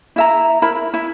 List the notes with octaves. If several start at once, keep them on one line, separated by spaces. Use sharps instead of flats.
E4 E5 A#5
E4 A#4 B5
E4